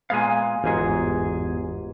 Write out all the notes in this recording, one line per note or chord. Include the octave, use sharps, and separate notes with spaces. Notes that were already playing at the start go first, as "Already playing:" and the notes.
A#2 G#3 B3 F5 G#5
G1 E2 G#2 F#4 G#4